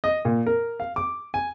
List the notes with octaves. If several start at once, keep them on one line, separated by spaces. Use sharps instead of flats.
D#5
A#2
A#4
F5
D6
G#5